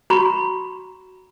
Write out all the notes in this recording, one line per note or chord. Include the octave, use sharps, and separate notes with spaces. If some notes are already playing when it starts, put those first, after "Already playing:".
F#4 A#5 B5 C#6